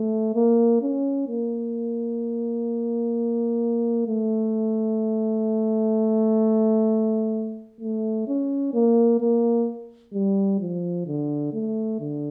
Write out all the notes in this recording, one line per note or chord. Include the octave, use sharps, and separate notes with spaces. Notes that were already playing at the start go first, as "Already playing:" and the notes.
Already playing: A3
A#3
C#4
A#3
A3
A3
C#4
A#3
A#3
G3
F3
D3
A3
D3